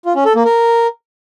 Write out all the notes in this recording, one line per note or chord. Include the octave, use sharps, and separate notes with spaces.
F4
C#4
A4
A#3
A#4